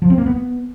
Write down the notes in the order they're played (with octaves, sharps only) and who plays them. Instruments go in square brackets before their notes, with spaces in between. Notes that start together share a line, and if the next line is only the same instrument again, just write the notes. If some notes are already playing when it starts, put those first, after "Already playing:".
[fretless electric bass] F3
C4
A#3
B3